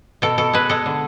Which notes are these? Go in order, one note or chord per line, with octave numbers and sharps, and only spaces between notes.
B2 A4
B2 A4
G#3 B4
G#3 A4
D3